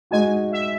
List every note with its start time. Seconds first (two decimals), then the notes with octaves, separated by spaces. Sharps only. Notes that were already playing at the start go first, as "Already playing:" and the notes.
0.11 G#3 D#4 F#4 G#5
0.52 E5